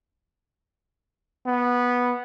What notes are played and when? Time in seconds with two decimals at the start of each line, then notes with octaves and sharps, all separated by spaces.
1.46 B3